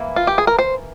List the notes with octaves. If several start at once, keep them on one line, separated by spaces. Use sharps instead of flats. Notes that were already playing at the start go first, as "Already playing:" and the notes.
Already playing: E3 A#3 E4
F4
G4
G#4
A#4
C5